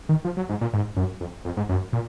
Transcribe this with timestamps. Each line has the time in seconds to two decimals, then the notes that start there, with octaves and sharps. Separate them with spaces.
0.09 D#3
0.25 F3
0.37 F#3
0.49 G#2
0.61 A#2
0.73 G#2
0.97 F#2
1.21 F2
1.45 F2
1.57 G#2
1.69 F#2
1.93 A#2